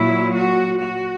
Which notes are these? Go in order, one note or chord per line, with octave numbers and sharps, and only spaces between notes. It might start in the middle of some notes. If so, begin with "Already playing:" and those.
Already playing: A#2 F#3 E4
F#4
F#4